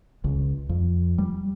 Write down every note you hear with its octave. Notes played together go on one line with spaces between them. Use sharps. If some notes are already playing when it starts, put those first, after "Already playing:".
C#2
F2
G3